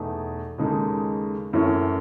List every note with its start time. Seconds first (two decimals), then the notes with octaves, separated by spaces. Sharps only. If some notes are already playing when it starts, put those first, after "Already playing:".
Already playing: E2 B2 A3 D#4
0.58 D#2 C#3 G#3 D#4 A4
1.53 F#2 E3 A3 C#4